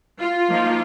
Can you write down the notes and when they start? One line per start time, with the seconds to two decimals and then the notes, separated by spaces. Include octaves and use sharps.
0.19 F4
0.49 F3 A#3 D#4